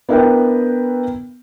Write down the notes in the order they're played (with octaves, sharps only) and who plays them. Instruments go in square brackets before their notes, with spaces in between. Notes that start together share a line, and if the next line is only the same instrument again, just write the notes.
[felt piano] B3 D4 E4 A#4 B4 G5